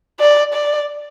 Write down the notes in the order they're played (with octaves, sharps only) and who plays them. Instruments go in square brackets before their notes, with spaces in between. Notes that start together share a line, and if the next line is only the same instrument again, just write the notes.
[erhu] D5
D5